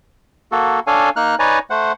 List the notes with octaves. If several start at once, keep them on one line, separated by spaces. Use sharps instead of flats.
A#3 F#4 A4
D4 A4 C#5 F5 G#5
A#3 D#4 F6 F#6
D#4 B4 C#5 D5 G#5 A#5
A3 C5 F#5